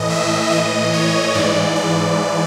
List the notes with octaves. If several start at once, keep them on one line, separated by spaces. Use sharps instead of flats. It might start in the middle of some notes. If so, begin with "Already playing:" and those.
Already playing: A2 E3 D#5
E5
A2 E3 D#5
C#5
G#2 E3 D5
D5